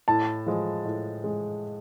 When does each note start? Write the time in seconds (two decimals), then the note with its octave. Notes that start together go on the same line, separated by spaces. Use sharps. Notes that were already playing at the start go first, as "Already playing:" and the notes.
0.08 A2 A5
0.46 F3 G#3
0.85 A2
1.24 G#3